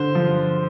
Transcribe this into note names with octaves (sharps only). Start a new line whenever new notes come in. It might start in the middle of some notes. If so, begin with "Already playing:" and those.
Already playing: D3 C5
F3